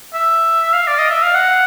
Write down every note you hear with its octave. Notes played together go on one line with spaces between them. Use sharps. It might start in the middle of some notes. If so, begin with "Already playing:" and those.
E5
F5
D5
D#5
E5
F5
F#5